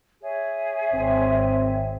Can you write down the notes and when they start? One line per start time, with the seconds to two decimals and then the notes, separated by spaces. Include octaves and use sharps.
0.22 G#4 C#5 E5
0.94 G#1 C4